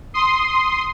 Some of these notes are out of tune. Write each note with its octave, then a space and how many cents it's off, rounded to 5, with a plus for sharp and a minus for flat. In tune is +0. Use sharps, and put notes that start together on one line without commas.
C6 -5 D#6 +0